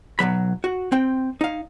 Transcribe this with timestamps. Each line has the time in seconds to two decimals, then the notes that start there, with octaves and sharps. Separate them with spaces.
0.19 B1 G#2 F#3 B5
0.64 F#4
0.92 C4 G5
1.41 D#4 F5